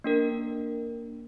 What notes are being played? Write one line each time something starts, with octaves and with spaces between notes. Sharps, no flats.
A#3 D4 A#4